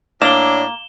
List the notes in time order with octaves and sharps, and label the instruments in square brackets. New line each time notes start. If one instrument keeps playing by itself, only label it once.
[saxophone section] A2 D4 [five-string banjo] A#3 [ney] C#5 [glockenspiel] E7 G7